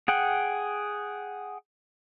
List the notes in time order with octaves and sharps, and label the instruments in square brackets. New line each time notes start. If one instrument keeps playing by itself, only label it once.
[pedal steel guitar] G#4 F#5 G5